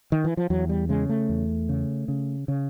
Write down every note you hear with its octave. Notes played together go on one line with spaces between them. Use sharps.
D#3
E3
F3
E2 F#3
G3
C#3 G#3
A3
E2
C#3
C#3
C#3